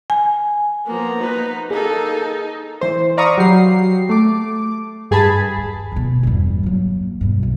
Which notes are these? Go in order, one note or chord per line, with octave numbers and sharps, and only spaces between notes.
G#5
F3 A#3 B3 A#5
D#4 B4
A#3 D#4 G#4 A4
E3 C5
D5 F5 A#5 B5 C#6 D#6
F#3 G4 C7
A3 D6
G2 G#4 G#5 A5 B5
D#2
D2 B2
E2 G2
F#3 A#3
G2 B2
B1